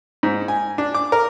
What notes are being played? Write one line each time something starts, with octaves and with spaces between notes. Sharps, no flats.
G#2
G#5
D4
D6
A#4